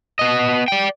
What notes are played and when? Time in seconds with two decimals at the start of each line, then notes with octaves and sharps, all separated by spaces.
0.19 B3 D#5
0.68 D5 G5